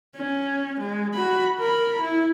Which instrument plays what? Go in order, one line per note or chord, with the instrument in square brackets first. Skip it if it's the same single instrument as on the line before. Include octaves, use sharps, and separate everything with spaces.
[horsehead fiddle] C#4
G#3
F#4 B5
A#4 B5
E4